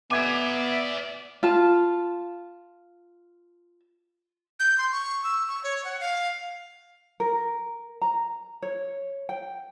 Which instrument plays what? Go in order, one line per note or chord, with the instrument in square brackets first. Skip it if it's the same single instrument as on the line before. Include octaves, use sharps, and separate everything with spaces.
[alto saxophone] B3 [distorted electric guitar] D5 G#5 [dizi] E5 [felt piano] D6 G#6
[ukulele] F4 A5
[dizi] G6
C6
C#6
E6
C#6
C#5
F#5
F5
[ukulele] A#4
A#5
C#5
G5